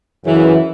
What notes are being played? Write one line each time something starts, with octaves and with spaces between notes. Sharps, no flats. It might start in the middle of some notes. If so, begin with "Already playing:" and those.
F#2 C#3 E3